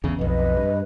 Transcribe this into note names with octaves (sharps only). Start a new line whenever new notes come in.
E2 C#3
B1 F2 B4 D#5
G2